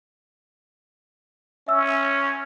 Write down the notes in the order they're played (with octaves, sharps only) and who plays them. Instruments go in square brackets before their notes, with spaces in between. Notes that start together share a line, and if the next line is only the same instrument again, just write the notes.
[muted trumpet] C#4 [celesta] E5 E6